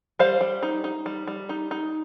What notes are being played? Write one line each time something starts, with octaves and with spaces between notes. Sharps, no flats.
G3 C5 F5
G3
D#4
D#4
G3
G3
D#4
D#4